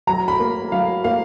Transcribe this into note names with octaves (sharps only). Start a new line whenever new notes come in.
F#3 A#5
B5
A#3
F#3 F5
A#3 F5